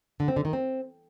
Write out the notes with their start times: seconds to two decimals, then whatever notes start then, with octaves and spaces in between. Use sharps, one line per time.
0.20 D3
0.28 C4
0.36 D3
0.45 D#3
0.53 C4